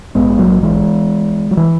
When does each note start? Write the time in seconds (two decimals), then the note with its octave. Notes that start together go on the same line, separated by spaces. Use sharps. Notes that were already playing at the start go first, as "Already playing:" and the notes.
0.15 A#1 G#2 G#3 B3
0.39 F#3 A#3
0.62 E3 G#3
1.51 F#3
1.57 E3